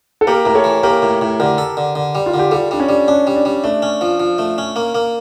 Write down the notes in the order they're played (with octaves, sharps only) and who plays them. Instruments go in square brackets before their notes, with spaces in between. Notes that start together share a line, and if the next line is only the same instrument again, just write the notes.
[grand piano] A4
[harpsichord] A#3 [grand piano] G4 A#4
[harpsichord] A2 [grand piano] A#4
[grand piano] A4 C#5
[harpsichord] E3
[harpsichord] A#3 [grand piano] G4 A#4
[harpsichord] A2
A2
[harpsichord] D3 [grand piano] G4 A#4
[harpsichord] A4
D3
D3
G3
[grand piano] F4
[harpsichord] D3
[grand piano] G4
[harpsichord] G3 [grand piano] F4 A4
[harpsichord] G3 [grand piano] D4
[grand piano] C#4
[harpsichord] G3
[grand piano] C#4 [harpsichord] D4
[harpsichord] G3
[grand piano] D4
[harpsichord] G3
[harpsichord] A3 [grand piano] D4
[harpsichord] C#4
F3
F3
A3
C#4
A#3
A#3